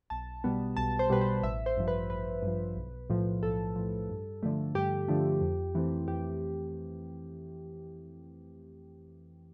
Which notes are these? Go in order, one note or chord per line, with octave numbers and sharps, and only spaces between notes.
B1 A5
B2 G3 B3
B1 A5
C5
B2 G3 B3 B4
C5
A1 E5
C5
G2 F3
B4
A1 B4
G2 F3
B1
A2 F3
B1 A4
A2 F3
G2
D3 F3 A3
G2 G4
D3 F3 A3
F2
E3 A3 C4
F2 G4